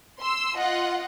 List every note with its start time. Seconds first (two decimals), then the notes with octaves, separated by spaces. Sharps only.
0.20 C6 E6
0.56 F4 D#5 F#5